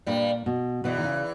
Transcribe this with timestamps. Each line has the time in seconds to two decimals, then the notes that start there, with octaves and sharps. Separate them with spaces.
0.06 G2 A#2 G3
0.46 B2
0.84 E2 B2 E3
0.97 D#3
1.04 C#3